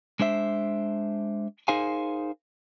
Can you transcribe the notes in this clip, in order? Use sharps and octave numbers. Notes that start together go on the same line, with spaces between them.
G#3 D4 C5 E5
D#4 G#4 A#4 C5 F5 G#5